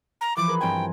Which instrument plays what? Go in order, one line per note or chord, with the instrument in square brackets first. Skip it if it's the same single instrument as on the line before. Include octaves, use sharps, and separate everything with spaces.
[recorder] A#5
[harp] E3 F3 [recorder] D6
[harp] G#4 A#4 B4
[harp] G2 C4 G#5 [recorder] G5